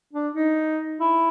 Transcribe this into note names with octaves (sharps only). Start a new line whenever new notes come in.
D4
D#4
E4